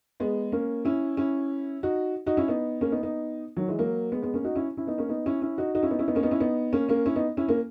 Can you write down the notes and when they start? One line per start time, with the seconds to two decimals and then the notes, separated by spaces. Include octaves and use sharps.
0.20 G#3 B3
0.52 A#3 C#4
0.85 C#4 E4
1.17 C#4 E4
1.83 D#4 F#4
2.26 D#4 F#4
2.37 C#4 E4
2.48 B3 D#4
2.81 A#3 C#4
2.92 B3 D#4
3.03 B3 D#4
3.57 D#3 F#3
3.68 E3 G#3
3.79 F#3 A#3
4.12 G#3 B3
4.22 G#3 B3
4.34 A#3 C#4
4.44 D#4 F#4
4.55 C#4 E4
4.77 C#4 E4
4.87 B3 D#4
4.98 A#3 C#4
5.09 B3 D#4
5.26 C#4 E4
5.42 C#4 E4
5.58 D#4 F#4
5.75 D#4 F#4
5.83 C#4 E4
5.91 B3 D#4
5.99 C#4 E4
6.08 B3 D#4
6.15 A#3 C#4
6.23 B3 D#4
6.31 C#4 E4
6.40 B3 D#4
6.73 A#3 C#4
6.89 A#3 C#4
7.05 C#4 E4
7.16 B3 D#4
7.37 C#4 E4
7.48 A#3 C#4